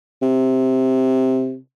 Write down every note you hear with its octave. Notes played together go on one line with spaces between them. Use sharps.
C3